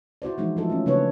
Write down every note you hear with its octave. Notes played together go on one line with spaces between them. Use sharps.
E4 F#4 C5 D5
E3 F3 G#3 D4 D#4
F3 F#3 A3 E4 F4 A4
A3 C#4
C#3 A#3 D4 B4 C#5